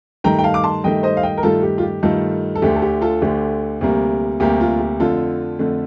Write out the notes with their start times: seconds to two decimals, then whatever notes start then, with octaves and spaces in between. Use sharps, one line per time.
0.24 G2 D#3 A3 G5 A#5
0.39 G5
0.44 F5 A5
0.54 D6
0.64 A5 C6
0.84 G2 D#3 A3 D#5 G5
1.03 C5 D#5
1.17 F5
1.23 D#5 G5
1.38 A#4
1.43 G2 D#3 A3 F4 A4
1.63 G4
1.78 F4
1.83 G4
2.03 G2 D#3 A3 F4 A4
2.55 A4
2.62 D2 D3 A3 G4
2.76 A4
2.82 G4
3.01 F4 A4
3.22 D2 D3 A3 G4
3.81 D2 C3 G3 A#3
4.40 D2 C3 G3 A#3 G4
4.61 F4
4.80 G4
5.00 F2 D3 A3 F4 A4
5.59 F2 D3 A3